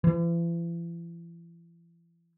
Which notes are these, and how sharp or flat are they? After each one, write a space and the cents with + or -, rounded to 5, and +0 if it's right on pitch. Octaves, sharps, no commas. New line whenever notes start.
E3 +40